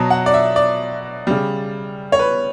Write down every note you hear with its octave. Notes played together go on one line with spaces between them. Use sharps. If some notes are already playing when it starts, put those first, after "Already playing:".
Already playing: B2 F#3 A5
F#5
D5
E5
D5
C#3 G3
C#5
B4